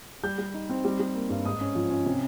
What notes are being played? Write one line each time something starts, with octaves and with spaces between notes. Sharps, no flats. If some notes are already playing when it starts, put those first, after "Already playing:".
G3 G6
G3
D#4
C4
G3
G3
A#3
G2
G#2 D#6
C#4
F3
C#4
C3